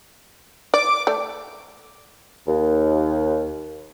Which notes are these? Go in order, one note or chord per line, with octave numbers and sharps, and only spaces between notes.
D5 D6
A3 D5
D#2